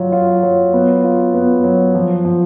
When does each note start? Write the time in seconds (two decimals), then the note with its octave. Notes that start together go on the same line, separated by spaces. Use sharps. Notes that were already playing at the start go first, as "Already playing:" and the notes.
Already playing: F#3 F4
0.12 F4
0.43 F#3
0.73 B3
1.04 F4
1.34 B3
1.64 F#3
1.95 F3
2.25 F3